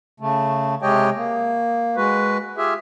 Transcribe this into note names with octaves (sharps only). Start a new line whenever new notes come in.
C#3 A3
C3 G#3 G4 C#5 D#5 G5
A#3
G#3 F#4 B4
F4 G4 G#4 E5